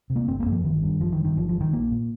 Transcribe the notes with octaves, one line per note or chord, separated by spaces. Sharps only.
C3
A#3
G1 C4
A#3
G2
F3
G1 D#3
G2
G1 F3
D#3
G2
D#3
G1 F3
F3
G2
D#3
A#1 A#3
A#2